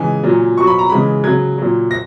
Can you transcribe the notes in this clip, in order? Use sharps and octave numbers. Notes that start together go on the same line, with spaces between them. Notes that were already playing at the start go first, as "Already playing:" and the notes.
Already playing: C#3 E3 G#3 G#5
A#2 F#3
B2 F#3 C#6
B5
A#5
C#3 E3 G#3 B5
C#3 F#3 G#6
A#2 F#3
A#6